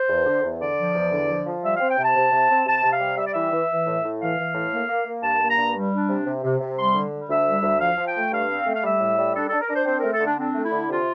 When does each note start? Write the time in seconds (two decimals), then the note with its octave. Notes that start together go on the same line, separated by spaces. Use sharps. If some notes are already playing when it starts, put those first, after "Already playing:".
Already playing: C5
0.09 E2
0.26 D3
0.43 E2
0.60 D3 D5
0.77 F3
0.95 E2
1.12 D3
1.28 F3
1.46 F3
1.63 G3 E5
1.76 C4 F5
1.89 G5
1.98 C3 A5
2.15 C3
2.32 C3
2.49 C4
2.66 C3 A5
2.83 C3
2.92 F5
3.00 G3
3.17 G3 E5
3.25 D5
3.32 E3 E5
3.52 E3
3.69 E3
3.86 A2
4.04 A2
4.20 E3 F5
4.37 E3
4.55 A2
4.72 A#3
4.89 A#3
5.06 A#3
5.23 G2 A5
5.40 A#3
5.49 A#5
5.58 G2
5.75 G3
5.92 D4
6.09 C3
6.26 C3
6.43 C3
6.60 C3
6.77 G3 C6
6.95 D3
7.12 G3
7.29 D2 E5
7.46 G3
7.63 D2
7.80 F3 F5
7.97 F3
8.06 G5
8.15 A3
8.32 G2 F5
8.49 C4
8.66 A3
8.73 F5
8.84 G3 E5
9.00 A2
9.18 G3
9.35 D4 A4
9.48 D4 A4
9.61 A#4
9.69 D4 C5
9.86 C4 C5
9.99 A3 A#4
10.12 A4
10.20 D3 D4
10.38 C4 D4
10.55 A3
10.63 E4
10.72 D3
10.89 C3 F4